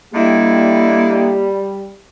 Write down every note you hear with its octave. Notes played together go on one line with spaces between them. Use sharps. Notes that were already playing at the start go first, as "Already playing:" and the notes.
D3 G3 A#3 D#4 E4 G4